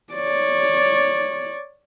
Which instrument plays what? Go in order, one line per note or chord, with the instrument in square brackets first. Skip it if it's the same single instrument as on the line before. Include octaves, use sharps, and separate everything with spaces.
[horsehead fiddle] C#5 D5